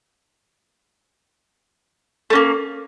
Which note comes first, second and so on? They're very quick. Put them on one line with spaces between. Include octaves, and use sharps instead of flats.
A3 C#4 A#3